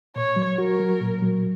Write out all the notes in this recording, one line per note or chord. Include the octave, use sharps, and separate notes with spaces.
A#2 C#5
F#3
F#4 A#4
F#3
A#2
F#3